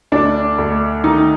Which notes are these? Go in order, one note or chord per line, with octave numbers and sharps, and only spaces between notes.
D2 D4
D2
D#3 D#4